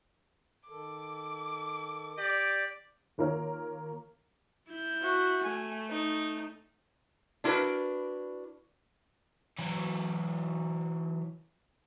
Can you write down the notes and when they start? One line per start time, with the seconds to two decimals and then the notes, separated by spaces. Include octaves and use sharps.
0.69 D#3 A4 D6
2.18 G4 D5
3.18 D#2 A#3 F4 A#4 C#5 F6
4.69 E4 G6
5.01 F#4 E5
5.44 A3 G#5
5.89 D#4
7.44 D4 E4 F#4 A#4 B4 D5
9.59 E3 F#3